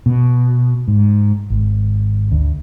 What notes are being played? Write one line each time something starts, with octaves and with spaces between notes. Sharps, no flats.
B2
G#2
G#1
D2